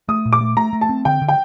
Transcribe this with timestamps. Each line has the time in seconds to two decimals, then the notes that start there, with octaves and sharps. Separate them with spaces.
0.08 A3 D#6
0.25 A#2
0.33 D6
0.41 A3
0.57 A3 A#5
0.73 A3
0.81 A5
0.89 C4
1.05 D3 G5
1.22 D3
1.28 G5